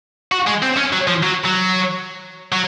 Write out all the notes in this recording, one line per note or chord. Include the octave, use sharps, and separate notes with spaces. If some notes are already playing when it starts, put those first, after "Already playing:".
F#4
G#3
C4
C#4
F#3
F3
F#3
F#3
F#3